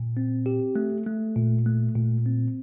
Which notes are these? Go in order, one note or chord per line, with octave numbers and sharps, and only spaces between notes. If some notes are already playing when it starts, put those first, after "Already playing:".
Already playing: A#2
C4
G4
A3
A3
A#2
A3
A#2
C4